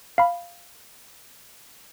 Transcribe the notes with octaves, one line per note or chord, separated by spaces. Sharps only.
F5 B5